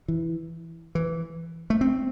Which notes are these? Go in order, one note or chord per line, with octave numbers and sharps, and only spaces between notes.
E3
E3
A3
C4